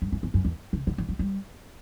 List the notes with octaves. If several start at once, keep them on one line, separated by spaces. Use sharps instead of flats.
G2
F#2
E2
F#2
E2
C#3
D3
E3
F#3
G3